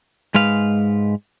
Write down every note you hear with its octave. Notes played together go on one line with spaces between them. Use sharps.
G#2 G#3 B4 F5